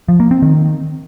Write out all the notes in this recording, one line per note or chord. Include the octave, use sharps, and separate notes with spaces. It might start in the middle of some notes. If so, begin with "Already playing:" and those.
F3
A#3
C4
D#3